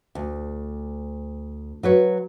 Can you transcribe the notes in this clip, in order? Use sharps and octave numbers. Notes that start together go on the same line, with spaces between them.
D2
F#3 B4 C#5